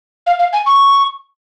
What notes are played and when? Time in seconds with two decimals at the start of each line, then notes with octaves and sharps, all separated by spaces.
0.27 F5
0.39 F5
0.53 G#5
0.66 C#6